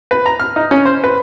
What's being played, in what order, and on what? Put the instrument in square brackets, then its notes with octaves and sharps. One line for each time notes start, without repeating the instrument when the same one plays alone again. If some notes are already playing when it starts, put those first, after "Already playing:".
[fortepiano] B4
A#5
F6
D#4
C#4
C5
B4